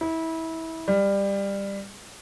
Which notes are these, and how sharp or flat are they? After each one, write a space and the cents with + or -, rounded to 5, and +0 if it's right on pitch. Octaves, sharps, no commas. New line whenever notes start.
E4 -25
G3 +20